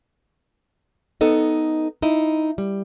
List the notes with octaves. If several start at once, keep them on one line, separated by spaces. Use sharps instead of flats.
B3 D#4 A4 D#5
D#4 E4 D#5
G3